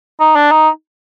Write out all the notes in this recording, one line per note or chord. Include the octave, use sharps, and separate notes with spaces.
D#4
D4
D#4